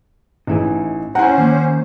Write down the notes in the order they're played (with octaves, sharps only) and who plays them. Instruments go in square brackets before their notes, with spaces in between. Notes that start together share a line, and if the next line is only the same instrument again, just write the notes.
[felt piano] A1 [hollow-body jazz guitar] D#4 E4 G#4
[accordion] C#4 C5 [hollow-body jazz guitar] E4 A#5 [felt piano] F#5 G#5
[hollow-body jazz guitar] D#3 A#3